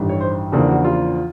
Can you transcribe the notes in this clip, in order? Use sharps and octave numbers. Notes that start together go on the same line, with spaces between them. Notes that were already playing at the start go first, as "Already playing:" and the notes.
Already playing: A1 G2 D#3 G3
C#5
C5
E2 C#3 F3 A#3 D4 A4
F#4
F4